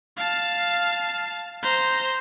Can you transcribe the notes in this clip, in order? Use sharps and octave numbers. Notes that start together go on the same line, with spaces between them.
F5 A5
C5 A#5